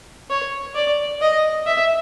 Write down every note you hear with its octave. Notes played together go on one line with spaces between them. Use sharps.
C#5
D5
D#5
E5